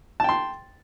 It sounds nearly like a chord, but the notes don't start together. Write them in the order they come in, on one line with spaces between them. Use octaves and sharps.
A5 G5 C6